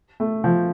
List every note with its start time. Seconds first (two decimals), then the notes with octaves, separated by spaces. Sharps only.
0.20 A3
0.44 F3